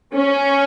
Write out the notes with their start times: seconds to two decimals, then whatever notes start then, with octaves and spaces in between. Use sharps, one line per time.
0.14 C#4